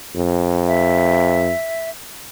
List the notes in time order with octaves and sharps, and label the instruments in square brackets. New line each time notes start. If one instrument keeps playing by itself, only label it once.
[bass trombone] F2
[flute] E5